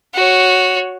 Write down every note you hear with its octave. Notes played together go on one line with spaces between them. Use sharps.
F#4 C#5